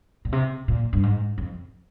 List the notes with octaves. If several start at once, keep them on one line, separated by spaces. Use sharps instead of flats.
A#2
C3
A#2
G2
G#2
F2